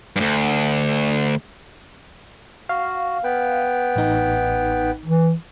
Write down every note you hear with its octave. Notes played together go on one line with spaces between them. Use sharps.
D2 G2
F#4 F5
B3 B4 G5
A1 D#4
E3